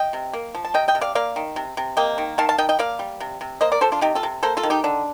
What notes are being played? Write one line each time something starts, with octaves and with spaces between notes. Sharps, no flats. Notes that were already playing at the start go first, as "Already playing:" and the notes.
Already playing: D#5 G5
C3
A#3
F3
A5
C3 D#5 G5
D#5 G5
C3
D5 F5
A#3 D5 F5
D#3
C3
C3
A#3 D#5 G5
D#3
D#3 F5 A5
F5 A5
D#3 D#5 G5
D#5 G5
A#3 D5 F5
G3
C3
C3
A#3 C5 D#5
A#4 D5
F3 A4 C5
D4 F4
C3 D#4 G4
F4 A4
C3
A#3 A4 C5
F4 A4
D#3
D#4 G4
D3 D4